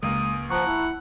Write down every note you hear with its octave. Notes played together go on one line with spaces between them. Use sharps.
C#2 G#3 A#3 D#6
F3 F#5 A5 A#5 C#6
E4